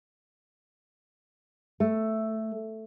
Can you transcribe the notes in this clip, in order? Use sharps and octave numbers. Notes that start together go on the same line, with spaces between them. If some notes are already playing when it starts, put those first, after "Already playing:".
A3